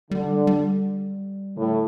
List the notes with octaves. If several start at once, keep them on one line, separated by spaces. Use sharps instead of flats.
D3 G3
G3
A2 D3